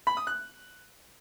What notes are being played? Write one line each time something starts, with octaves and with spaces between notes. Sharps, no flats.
B5
D#6
F#6